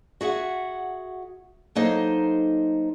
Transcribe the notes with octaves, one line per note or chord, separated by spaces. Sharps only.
F#4 G#4 E5 F#5
F#3 A#3 D#4 A4 C5